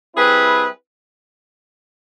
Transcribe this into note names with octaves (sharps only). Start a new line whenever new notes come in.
G3 C4 E4 G#4 B4